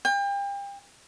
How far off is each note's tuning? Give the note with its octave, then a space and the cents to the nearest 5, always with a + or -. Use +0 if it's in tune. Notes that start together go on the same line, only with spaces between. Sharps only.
G5 +35